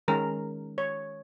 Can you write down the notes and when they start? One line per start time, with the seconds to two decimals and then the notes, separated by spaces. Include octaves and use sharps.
0.08 D#3 G#3 C#4 A#4
0.78 C#5